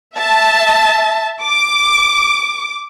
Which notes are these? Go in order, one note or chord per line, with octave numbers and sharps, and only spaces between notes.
E5 A5
D6